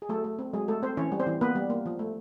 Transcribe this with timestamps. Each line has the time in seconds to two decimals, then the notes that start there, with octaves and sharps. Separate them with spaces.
0.02 G#4
0.09 F#3 A3 A4
0.24 A3
0.39 C4
0.53 F#3 G#3 G#4
0.68 A3 A4
0.83 C4 C5
0.97 E3 C#4 C#5
1.12 G3
1.20 C4 C5
1.27 E3
1.41 A#3 B3 B4
1.55 G3
1.70 A#3
1.86 F3
1.99 A3